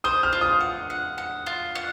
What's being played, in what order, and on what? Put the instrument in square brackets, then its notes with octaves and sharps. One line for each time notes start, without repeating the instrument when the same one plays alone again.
[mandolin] C5 [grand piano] D#6
[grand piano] F6
[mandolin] F4
[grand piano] D#6
[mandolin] F#5
F#5
F#5
F4
F#5